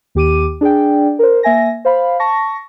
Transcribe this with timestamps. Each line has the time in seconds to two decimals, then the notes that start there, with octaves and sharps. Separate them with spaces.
0.15 D#2 G4 D6 D#7
0.61 D4 G#4 D5 G5
1.19 A#4 C5
1.43 A#3 E5 G#5 A#6
1.85 C5 F5 B5
2.20 A5 C#6 A#6